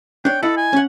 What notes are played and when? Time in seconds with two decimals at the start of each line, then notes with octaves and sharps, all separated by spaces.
0.25 D4 C#5 G5
0.43 E4 A4 D#5 F#5
0.57 G#5
0.73 C#4 F#5